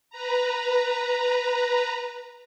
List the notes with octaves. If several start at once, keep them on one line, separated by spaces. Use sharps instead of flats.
B4 A#5